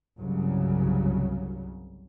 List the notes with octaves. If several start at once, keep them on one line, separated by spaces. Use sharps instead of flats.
G1 C2 C#3 F#3